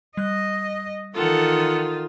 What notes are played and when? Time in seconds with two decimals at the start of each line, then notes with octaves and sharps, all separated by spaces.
0.17 G3 D#5 F#6
1.14 D#3 E3 F4 A4 F#5